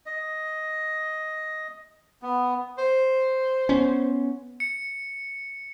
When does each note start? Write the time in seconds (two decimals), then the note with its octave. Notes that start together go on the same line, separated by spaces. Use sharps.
0.06 D#5
2.22 B3
2.78 C5
3.69 B3 C#4
4.60 C#7